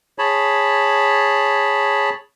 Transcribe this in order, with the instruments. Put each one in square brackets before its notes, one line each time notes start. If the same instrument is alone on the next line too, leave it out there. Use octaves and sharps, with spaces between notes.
[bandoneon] G#4 C#5 A5 B5